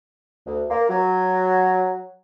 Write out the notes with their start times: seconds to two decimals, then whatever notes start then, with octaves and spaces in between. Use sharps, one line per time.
0.46 D2
0.70 A#3
0.89 F#3